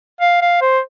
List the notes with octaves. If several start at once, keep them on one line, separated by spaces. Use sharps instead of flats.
F5
F5
C5